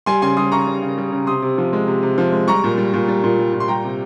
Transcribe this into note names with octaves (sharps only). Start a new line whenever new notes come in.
G3 G#5 C6
C#3 G#5 C6
G3 C6 D#6
C#3 A#5 C#6
G3
C#3
G3
C#3
C3 C6 D#6
C3
F3
G#3
C3
C3
F3
G#3
G3 A#5 C#6
A#2
G3
A#2
G3
A#2
G3
A#2
C6
G3 G5 A#5
C3